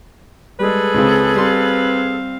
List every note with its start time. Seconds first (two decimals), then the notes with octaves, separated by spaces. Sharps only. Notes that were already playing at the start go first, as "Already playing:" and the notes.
0.59 G3 G#3 G#4 A4 B4
0.94 C#2 C#3 C4
1.36 G3 C4 F5 C6